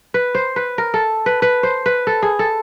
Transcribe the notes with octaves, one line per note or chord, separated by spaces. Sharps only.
B4
C5
B4
A#4
A4
B4
B4
C5
B4
A4
G#4
A4